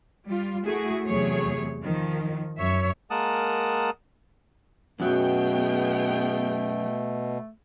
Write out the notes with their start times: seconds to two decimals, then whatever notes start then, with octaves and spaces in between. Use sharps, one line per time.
0.27 G3 F4
0.65 A3 E4 F#4 G#4
1.05 E2 C3 F#3 A3 G#4 C#5
1.83 D#3 F3
2.58 F#2 C#5 E5
3.11 G#3 A#3 A#4 F#5 A5 D#6
5.00 F#2 B2 F#3 A3 B3 G#4 G5